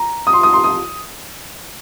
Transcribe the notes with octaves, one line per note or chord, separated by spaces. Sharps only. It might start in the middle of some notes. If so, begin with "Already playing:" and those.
Already playing: A#5
D#6
C6
D#6
C6
D#6